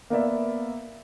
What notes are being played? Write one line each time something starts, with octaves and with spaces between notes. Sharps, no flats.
A#3 B3 D5 E5